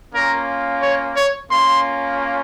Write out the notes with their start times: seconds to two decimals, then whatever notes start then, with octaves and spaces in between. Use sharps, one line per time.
0.12 A#3 C#4 F4 A#4
0.82 C#5
1.16 C#5
1.51 A#3 C#4 F4 C6